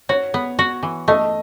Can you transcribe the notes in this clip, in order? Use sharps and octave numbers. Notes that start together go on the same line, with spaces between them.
F#4 C#5
B3
F#4
E3
A3 D#5